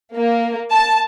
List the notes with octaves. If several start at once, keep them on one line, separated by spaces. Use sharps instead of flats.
A#3
A5